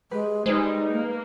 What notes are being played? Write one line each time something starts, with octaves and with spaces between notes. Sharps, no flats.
G#3 G4 B4
G3 G#3 D#4 B4 C5
A#3